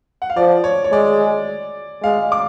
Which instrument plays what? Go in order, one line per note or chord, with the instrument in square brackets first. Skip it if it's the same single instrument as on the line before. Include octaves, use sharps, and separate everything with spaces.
[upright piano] F#5
F5
[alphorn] F3 [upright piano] D5
[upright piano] C#5
C#5
[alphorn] G#3 [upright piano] D5
[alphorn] G#3 [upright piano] F5
[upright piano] D6